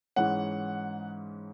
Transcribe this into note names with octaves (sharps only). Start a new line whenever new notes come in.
G#2 E3 G#3 C#4 F#5